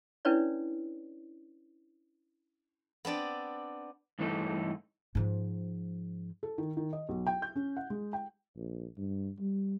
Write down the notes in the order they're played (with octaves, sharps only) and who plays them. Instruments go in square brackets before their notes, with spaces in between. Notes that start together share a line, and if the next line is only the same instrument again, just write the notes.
[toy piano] C#4 D4 E4 B4 C#5 D5
[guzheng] B3 C4 D4 D5
[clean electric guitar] G2 E3 A3 D#4 E4 A4
[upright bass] G#2 F3
[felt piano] A4
D#3
D#3
D#5
B1
G5
G6
C#4
F#5
G#3
G5
[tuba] A#1
G2
G3